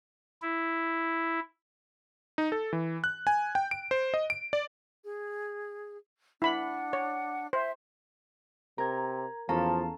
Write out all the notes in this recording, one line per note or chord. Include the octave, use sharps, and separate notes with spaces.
E4
D#4
A4
E3
F#6
G#5
G5
D7
C5
D#5
D7
D5
G#4
D4 E4 F#5 B5
C#5
C5 E5
C3 A#4 A#5 G#6
E2 F3 C#4 A4 F5 A5 A#5